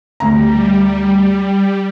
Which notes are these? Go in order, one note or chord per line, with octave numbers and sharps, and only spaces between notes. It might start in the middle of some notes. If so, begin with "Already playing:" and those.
D2 G3 A#5